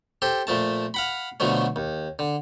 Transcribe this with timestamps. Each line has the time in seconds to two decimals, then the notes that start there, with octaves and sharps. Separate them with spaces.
0.22 G4 A4 C5
0.47 A#2 F3 A3 A5
0.94 F5 F#5 B5
1.40 B2 D3 F3 F#3 A3
1.76 D#2
2.19 D3